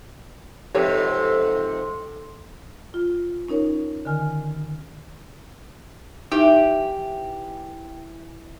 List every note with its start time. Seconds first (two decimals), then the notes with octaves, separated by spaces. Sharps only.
0.74 F2 G#2 C3 G4 A4 B4 C#5
2.94 F4
3.49 C#4 D#4 A#4 C#5
4.05 D3 D#3 A#4 G#5 F6
6.32 E3 D#4 G4 D6